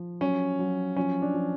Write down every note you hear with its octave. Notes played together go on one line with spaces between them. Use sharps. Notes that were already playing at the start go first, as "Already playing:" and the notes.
Already playing: F3
F#3 C#4
F#3
F3 C#4
D4
F3